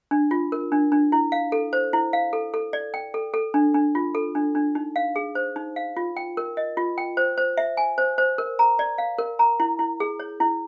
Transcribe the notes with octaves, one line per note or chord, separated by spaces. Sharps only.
D4
F4
A#4
D4
D4
E4
F5
A4
C5
E4
F5
A4
A4
D5
G5
A4
A4
D4
D4
F4
A4
D4
D4
D#4
F5
G#4
C5
D#4
F5
F4
G5
A#4
D#5
F4
G5
C5
C5
E5
G#5
C5
C5
A#4
A#5
D5
F5
A#4
A#5
E4
E4
G#4
C#5
E4